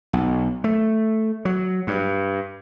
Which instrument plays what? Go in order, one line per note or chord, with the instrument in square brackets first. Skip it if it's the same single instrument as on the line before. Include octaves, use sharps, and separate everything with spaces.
[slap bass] B1
A3
F#3
G2